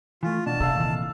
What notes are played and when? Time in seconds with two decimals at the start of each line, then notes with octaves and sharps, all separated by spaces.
0.23 E3 A3 F4
0.46 B2 D4 A5
0.60 C3 A4 F5
0.75 A#2 D#3 E3